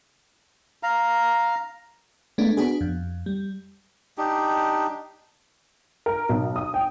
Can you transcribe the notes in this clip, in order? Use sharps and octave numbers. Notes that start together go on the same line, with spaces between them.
F5 A#5
G#3 A3 B3 D4
B3 D4 F#4 G#4
F2
G3
D4 D#4 G4
A#4
B1
D#6
G5